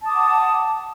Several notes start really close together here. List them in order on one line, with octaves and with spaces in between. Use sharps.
A5 D#6 D6 F#5